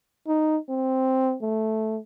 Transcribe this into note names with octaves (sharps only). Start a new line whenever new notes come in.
D#4
C4
A3